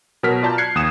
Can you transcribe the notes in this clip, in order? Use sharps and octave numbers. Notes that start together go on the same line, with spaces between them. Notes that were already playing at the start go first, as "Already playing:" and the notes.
B2 F#3 A#4 F6 B6
F4 D5 A5 A#5 G6
F#6 G#6 C7 C#7
D#2 D#6 E7